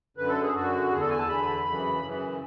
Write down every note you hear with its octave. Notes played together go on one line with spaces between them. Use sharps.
F#2 D3 B4
A4
G#4
F#2 D3 F#4
E2 D3 G#4
A4
G#5
A5
E2 D3 B5
F#2 C#3 E3
F#2 C#3 E3